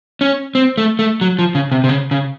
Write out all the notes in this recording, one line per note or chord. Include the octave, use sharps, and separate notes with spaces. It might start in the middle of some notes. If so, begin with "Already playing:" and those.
C#4
C4
A3
A3
F#3
F3
C#3
C3
C3
C#3
C#3